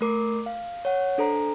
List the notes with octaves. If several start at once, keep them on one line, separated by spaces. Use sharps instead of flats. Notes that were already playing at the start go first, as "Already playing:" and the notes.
A3 A#4 D6 C7
F5
C#5 F#5
D4 A4 C5 A#5